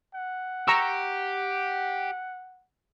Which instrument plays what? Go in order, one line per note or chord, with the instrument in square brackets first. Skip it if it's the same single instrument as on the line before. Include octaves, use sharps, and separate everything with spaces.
[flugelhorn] F#5
[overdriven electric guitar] G4 [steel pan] A#5 C#6 E6